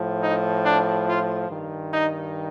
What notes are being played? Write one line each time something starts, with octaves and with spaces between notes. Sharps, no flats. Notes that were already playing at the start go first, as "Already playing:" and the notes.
Already playing: A2 F3
D#4
D4
F4
G2 D#3
D#4